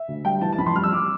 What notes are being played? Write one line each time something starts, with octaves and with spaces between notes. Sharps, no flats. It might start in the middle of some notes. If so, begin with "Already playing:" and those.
Already playing: E5
D2
G3 G5
E3 A5
A5
F2 B5
C6
G3 F6
E6
G3 D6